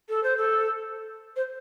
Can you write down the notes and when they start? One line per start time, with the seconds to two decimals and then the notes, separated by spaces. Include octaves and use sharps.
0.09 A4
0.23 C5
0.37 A4
1.36 C5